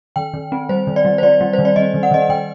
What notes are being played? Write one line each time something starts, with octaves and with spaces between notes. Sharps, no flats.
D#3 G5
D#3
C4
G3 C5
D#3
D5
G3
C5
G3 D5
G3
C5
D#3
D5
D#3 D#5
D#3
F#5
D#3 D#5
F#5
D#3 G5